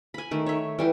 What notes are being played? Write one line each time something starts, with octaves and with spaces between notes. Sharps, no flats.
G#5 B5
D#3 A3
C#5 E5
E3 G3 G4